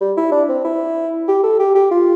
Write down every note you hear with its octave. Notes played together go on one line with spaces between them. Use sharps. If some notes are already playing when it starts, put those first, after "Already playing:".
G3
E4
D4
C4
E4
G4
A4
G4
G4
F4